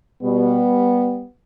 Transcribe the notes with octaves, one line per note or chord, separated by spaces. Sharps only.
B2 G3 B3